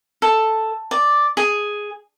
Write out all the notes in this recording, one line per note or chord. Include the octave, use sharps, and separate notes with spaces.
A4
D5
G#4